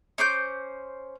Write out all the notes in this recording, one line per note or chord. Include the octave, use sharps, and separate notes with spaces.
C#4 C5 D6 G6